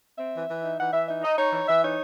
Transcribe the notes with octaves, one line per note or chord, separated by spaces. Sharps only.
C4 E5
E3
E3
D#4
E3 F#5
E3 E5
D#4 E5
D#4 D#5
D#4 C#5
E3 C#5
E3 E5
D#4 C#5